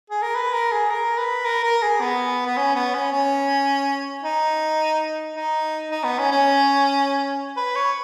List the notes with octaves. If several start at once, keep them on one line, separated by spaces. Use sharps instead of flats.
G#4
A#4
B4
A#4
G#4
A#4
B4
A#4
A#4
G#4
B3
B3
C#4
B3
C#4
C#4
D#4
D#4
D#4
B3
C#4
C#4
B4
C#5